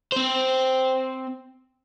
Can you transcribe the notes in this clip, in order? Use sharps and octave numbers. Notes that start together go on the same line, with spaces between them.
C4 C5